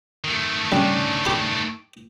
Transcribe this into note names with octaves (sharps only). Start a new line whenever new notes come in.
D#3 A3
C#3 G3 D4
G4 B5